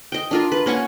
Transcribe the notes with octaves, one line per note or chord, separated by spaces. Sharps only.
D#5 G5
D4 F4 A#4
B4
A#3 C#4 F#5 G#5